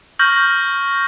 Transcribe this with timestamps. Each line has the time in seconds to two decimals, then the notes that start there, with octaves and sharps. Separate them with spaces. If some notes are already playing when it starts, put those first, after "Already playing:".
0.19 C#6 F6 G6 A#6 F#7